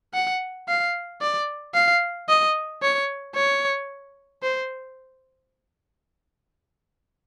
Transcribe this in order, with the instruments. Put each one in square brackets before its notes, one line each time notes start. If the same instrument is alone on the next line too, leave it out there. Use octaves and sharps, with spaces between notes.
[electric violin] F#5
F5
D5
F5
D#5
C#5
C#5
C5